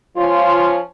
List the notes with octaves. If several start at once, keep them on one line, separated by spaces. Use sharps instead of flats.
F3 C#4 F4